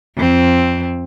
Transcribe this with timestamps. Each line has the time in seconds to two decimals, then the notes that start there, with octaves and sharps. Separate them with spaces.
0.16 F2 C4